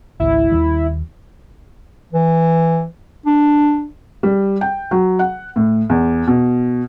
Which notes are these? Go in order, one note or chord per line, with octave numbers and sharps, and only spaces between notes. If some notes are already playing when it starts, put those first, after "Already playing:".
G#1 C#2 G#2 E4
D#2 D#3 G3
E3
D4
G3
G5
F#3
F#5
A2
E2
B2